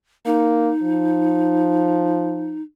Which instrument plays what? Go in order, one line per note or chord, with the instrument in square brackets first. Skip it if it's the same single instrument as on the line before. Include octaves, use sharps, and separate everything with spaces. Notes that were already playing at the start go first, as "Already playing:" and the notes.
[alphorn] A#3 [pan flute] D#4
[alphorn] F3